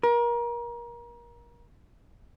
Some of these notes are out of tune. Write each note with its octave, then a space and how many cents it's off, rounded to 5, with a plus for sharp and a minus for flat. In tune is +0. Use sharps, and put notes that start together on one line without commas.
A#4 +30